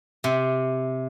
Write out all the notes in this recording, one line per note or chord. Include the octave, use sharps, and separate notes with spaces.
C3